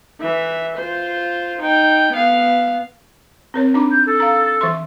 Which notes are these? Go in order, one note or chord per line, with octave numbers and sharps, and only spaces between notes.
E3 E5
F4 C5
D#4 G5
B3 F5
C4 A#4 C#5
D4 D#4 D6
G6
A4
F5 A#5
E3 E5 C6